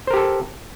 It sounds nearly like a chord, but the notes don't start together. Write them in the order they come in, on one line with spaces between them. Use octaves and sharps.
C5 A#4 G4 A4